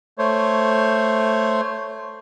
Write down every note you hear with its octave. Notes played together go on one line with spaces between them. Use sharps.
A3 C5 C#5